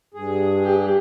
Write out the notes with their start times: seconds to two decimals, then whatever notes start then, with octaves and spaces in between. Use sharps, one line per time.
0.14 G2 G#4
0.63 G4